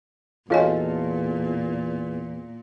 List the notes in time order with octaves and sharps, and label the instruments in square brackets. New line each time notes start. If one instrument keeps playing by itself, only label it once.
[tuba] E2 [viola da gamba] A#2 [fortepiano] F4 A4 C#5 [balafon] F#4 D#5 G#5